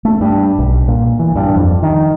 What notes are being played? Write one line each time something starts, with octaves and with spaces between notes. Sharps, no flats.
A3
G2
B1
A#2
E3
G2
F2
D#3